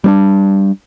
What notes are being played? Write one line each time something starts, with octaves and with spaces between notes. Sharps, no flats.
G3 B3 D4